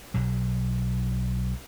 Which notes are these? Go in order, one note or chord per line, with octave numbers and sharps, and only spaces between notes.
B1 B2 F#3